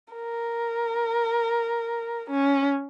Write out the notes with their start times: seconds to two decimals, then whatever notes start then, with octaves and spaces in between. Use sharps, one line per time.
0.13 A#4
2.30 C#4